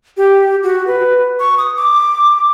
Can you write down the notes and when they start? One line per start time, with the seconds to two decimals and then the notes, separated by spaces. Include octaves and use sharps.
0.17 G4
0.63 F#4
0.87 B4
1.40 C#6
1.58 D#6
1.77 D6